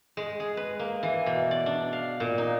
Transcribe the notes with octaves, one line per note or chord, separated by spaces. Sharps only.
G#3
G#4
B4
A#3
E3
B2
D5
D4
F5
A#2
D#4